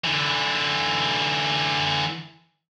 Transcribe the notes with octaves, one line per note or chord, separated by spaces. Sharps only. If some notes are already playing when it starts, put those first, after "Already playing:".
D3 E3